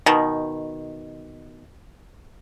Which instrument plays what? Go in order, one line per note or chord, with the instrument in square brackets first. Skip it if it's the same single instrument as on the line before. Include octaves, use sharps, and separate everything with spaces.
[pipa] B2 D#3